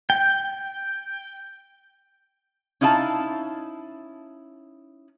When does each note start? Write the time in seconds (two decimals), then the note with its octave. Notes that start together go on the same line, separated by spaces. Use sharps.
0.10 G5
2.81 C#4 D#4 E4 F5 A5